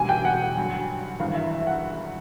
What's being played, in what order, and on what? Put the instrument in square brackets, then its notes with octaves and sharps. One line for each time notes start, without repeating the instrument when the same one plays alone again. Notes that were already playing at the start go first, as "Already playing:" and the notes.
Already playing: [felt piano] E1 D2 D3 G3 [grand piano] G#5
[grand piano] G5
F#5
[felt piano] G2 D3 F#3
[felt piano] G#1 G2 E3 [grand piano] F5
[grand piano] E5
E5
F#5